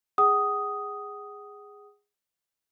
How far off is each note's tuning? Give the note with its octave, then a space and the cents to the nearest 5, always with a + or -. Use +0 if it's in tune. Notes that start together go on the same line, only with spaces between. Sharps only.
G#4 -15 F#5 +40 D#6 +0